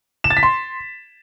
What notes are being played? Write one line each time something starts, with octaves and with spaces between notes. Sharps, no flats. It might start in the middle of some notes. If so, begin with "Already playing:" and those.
E7
A6
B6
C6